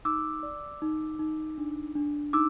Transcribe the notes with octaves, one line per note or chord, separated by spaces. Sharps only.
D#4 D6 E6
D5
D#4
D#4
D4
D4
D#4 D6 E6